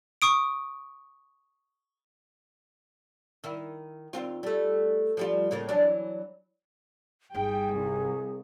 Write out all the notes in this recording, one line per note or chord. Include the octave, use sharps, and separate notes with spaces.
C#6 D#6 D7
D#3 E4
D#2 C4 F4
G3 A3
F3 G3 F4
A2 C#3 A#3
E3 F#3 D4
G1 G3 D#4 G#4 G5
C2